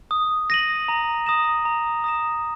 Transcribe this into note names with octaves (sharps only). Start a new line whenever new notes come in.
D#6
A#6 D#7 F#7
A#5
D#6 A#6 E7
A#5
D#6 A#6 E7